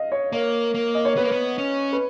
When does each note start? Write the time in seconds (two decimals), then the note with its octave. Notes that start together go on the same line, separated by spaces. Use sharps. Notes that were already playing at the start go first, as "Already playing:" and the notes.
Already playing: D#5 F5
0.12 C#5
0.32 A#3 C#5
0.74 A#3
0.95 D#5
1.05 C#5
1.16 B3 B4
1.24 A#3
1.31 B3
1.58 C#4
1.93 B4